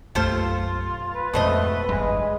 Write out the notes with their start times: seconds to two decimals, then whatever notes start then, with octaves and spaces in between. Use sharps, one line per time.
0.15 B1 F#2 A3 F4 G4 A4 C5
1.14 B4
1.33 F2 G#2 B2 D3 A3 C4 D#5
1.89 G1 E2 G2 G#3